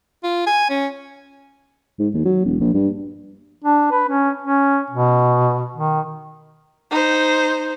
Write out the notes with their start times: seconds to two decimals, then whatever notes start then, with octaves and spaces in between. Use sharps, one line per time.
0.24 F4
0.47 G#5
0.70 C#4
1.99 G#2
2.14 D#2
2.25 F#3
2.45 E1
2.60 A#1
2.74 G2
3.64 D4
3.92 B4
4.09 C#4
4.43 C#4
4.90 B2
5.76 D#3
6.91 D#4 C5